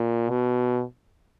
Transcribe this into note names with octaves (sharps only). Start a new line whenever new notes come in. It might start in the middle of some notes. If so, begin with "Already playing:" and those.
Already playing: A#2
B2